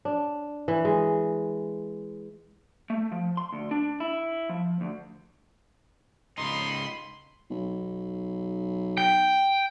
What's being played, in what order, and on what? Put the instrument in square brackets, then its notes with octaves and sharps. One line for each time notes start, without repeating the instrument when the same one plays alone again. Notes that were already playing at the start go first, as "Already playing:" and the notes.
[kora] D4
E3
G#3
[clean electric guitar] A3
F3
C6
D2
D4
E4
F3
D2
[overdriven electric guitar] C#2 D#4 [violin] B5 C6
[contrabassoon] B1
[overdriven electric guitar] G5